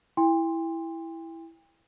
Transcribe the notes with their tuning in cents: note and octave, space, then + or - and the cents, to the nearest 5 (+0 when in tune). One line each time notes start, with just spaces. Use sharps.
E4 +0 G5 +40 C6 +0